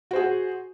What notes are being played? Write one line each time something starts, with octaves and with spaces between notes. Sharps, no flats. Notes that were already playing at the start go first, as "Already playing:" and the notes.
F#4 G#4 C5